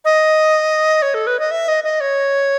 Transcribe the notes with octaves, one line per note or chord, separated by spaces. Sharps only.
D#5
C#5
A4
B4
D#5
E5
D#5
D#5
C#5